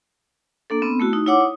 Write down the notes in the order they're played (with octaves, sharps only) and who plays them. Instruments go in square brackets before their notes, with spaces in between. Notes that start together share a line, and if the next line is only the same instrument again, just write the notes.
[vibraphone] A#3 D4 A4
B3 C4
A3 E4 F#4
D#4
E4 C#5 F#5 D6
D#6